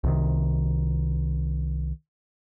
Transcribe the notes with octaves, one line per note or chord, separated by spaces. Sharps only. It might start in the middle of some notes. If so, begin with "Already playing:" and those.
C2 C3 D#3